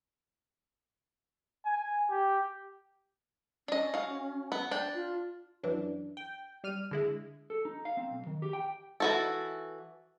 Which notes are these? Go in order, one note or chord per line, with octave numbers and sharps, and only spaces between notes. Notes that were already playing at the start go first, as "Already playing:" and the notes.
G#5
G4
C#4 D4 D#5
F#4 F5
B3
D4 G5
F4
F#2 E3 D4
G5
G3 F6 D#7
D3 G#3 E4
A4
D#4
F5
C4
B1
D#3
G4
G5
E3 F#4 A4